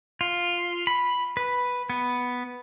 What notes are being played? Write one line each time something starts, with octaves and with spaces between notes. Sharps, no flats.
F4
B5
B4
B3